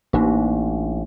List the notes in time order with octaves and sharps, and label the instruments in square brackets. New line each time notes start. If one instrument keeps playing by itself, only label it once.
[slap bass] A1 [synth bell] A#3 D4 D#4